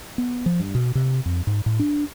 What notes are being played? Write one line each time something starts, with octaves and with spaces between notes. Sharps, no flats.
B3
F3
G2
B2
C3
F2
G#2
A2
D4